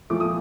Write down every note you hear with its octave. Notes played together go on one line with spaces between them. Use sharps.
A#2 F3 A3 D6
D#6